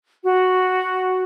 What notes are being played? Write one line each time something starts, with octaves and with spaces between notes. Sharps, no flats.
F#4